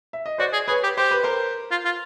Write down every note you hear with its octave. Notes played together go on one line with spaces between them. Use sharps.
E5
D#5
F#4 C5 D5
G#4
G#4 B4 C#5
G4
G4 C5
B4
A#4 C5
F4
F4